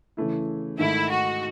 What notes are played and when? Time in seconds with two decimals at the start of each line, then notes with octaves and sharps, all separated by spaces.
0.17 C#3 E3 A3 E4
0.79 G#2 D#3 A3 D#4 E4
1.10 F#4